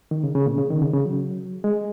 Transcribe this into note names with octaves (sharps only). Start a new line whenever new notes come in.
D#3
C#3
C#3
A#2
C#3
D#3
C#3
C#3
F#3
G#3